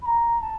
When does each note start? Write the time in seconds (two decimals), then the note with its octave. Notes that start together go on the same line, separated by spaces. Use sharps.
0.02 B5
0.06 A#5
0.41 A5